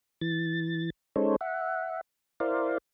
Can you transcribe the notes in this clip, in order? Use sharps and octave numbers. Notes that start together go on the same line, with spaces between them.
E3 A6
G#3 C#4 D#4 A4 C5 C#5
E5 F#5
E4 A#4 C5 D5 F5